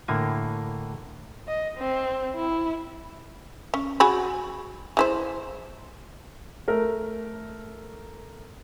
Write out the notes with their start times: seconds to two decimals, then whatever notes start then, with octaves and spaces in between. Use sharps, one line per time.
0.08 A2 D3 A#3 G#5
1.48 D#5
1.78 C4
2.35 E4
3.74 C#4
4.00 F#4 G#4 B5
4.97 G#3 E4 C5
6.68 A3 A#4